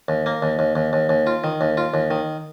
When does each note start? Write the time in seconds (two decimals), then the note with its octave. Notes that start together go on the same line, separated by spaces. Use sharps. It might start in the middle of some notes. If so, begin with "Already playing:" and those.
0.08 D#2
0.26 A#3
0.42 D#2
0.59 D#2
0.75 D#2
0.93 D#2
1.09 D#2
1.27 F4
1.44 D#3
1.61 D#2
1.77 F4
1.94 D#2
2.11 D#3